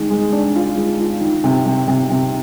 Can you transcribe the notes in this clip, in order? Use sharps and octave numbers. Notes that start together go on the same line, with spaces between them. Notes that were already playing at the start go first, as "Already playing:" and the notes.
Already playing: D#3 G#3
G#3
D4
F4
G#3
F4
D#3
C3
C3
C3
C3